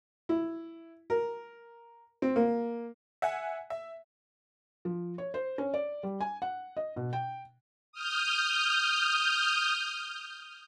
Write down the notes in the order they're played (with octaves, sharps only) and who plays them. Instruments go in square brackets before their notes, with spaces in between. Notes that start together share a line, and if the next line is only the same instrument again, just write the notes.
[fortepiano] E4
A#4
C4
A#3
[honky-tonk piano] E5 F#5 G#5
E5
[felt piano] F3
C#5
C5
C#4
D5
G3
G#5
F#5
D#5
B2
G5
[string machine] D#6 F6 G6